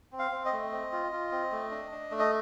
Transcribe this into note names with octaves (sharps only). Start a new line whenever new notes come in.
C4
F5
C4
D#5
A3
C4
F4
F4
C4
A3
D4
D4
A3
D#5